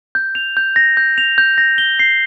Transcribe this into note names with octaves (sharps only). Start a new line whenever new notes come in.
G6
F7
G6
A#6
G6
F7
G6
A#6
G7
C7